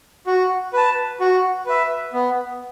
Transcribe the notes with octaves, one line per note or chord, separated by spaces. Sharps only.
F#4
B4 A5
F#4
B4 E5
B3